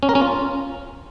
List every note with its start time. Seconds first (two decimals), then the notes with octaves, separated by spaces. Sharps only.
0.03 C#4
0.09 A#4
0.15 C#4
0.22 F4